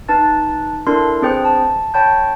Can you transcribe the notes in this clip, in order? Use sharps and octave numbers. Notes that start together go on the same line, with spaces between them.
D#4 B4 A5 A6
D4 E4 A4 A#4 C6
C4 D4 G#4 B4 C5 G5
A5
C#5 G5 A5 B5 G6